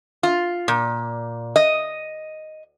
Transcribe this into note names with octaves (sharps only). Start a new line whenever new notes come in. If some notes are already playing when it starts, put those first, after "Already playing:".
F4
A#2
D#5